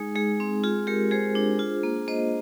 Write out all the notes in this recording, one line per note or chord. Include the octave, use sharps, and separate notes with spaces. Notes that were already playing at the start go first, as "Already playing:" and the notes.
Already playing: G#3 D#4 G#4
G#3 G#4
C4
F4 G#4
G#3 G4 A#4
G#3 G#4 C5
D4
F4
A#3
A#3 C5 D#5